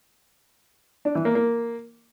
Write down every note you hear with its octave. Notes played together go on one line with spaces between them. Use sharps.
D4
E3
A#3
A#3